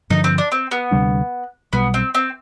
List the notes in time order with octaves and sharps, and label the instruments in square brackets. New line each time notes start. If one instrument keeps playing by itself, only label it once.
[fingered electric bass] G2 D3 F3 [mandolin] D#4
[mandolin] C4
D4
C4
B3
[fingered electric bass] D2 C3 G3 D4
[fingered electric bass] B1 B2 G3 [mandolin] B3
[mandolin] C4
C4